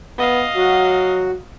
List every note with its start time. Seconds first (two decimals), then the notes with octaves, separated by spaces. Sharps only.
0.19 B3 D#5 F5
0.56 F#3 F#4